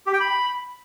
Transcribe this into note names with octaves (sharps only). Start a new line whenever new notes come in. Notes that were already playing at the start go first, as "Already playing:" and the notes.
G4
G5
B5